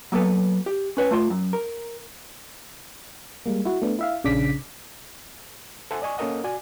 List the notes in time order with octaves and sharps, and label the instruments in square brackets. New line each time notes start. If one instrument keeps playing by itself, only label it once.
[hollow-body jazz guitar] F#3 A#3 B3 A4 B4
G4
C#4 B4 C#5
A3 F4 C6
F#2
A#4
[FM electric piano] G3 G#3 A#3
E4 F#4
A3 B3 D4
E4 E5 F5
A#1 C#3 D4 D6 B6
[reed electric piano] A4 C5 E5 F#5 G#5
D5 D#5 G#5 C#6
A#3 C#4 A4 A#4 D#5 F#5
F#4 D5 G#5